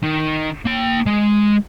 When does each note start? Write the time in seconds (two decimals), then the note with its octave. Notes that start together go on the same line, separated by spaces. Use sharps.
0.03 D#3
0.65 A#3 G5
1.06 G#3